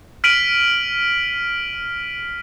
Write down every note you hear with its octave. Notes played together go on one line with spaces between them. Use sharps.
F6 B6 D7 D#7 F#7